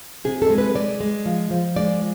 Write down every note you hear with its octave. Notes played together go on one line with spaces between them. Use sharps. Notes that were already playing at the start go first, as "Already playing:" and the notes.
C3 G#4
A4
G#3
B4
G#3 D5
G#3
F3
F3
G#3 D5